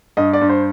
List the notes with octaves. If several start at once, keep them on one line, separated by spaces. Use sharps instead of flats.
G2 D#5
D5
G2
C5